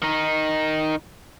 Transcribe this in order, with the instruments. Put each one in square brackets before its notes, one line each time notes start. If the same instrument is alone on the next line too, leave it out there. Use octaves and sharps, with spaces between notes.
[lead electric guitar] D#3 D#4